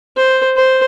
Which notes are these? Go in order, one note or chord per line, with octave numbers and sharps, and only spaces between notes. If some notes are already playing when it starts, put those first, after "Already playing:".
C5
C5